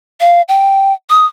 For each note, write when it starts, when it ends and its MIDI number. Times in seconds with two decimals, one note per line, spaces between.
0.21 0.42 77
0.48 0.93 79
1.10 1.25 87